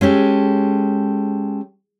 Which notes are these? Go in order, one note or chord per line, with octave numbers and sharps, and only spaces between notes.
G#3 C#4 G4 A4